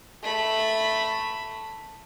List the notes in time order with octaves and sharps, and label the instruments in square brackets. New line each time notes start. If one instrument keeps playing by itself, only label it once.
[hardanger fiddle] A3 B5